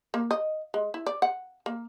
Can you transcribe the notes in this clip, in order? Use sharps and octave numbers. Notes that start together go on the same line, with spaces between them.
A#3
D#5
G#3
E4
D5
F#5
A#3